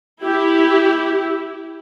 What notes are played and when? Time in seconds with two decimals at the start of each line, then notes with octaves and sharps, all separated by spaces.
0.23 E4 G4